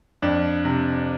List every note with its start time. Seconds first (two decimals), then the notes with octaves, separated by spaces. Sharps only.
0.22 F2 D4
0.65 C3